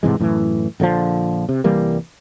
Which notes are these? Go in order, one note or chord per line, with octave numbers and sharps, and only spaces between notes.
G#2 C3 E3 G#3
F#2 A2 E3
A#1 D3 D#3 F3
C3
C2 E3 G3 A#3